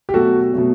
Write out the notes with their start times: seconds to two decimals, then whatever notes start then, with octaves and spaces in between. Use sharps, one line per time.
0.09 G4
0.14 B2 F#3 A3 F#4 A4
0.54 B2 F#3 A3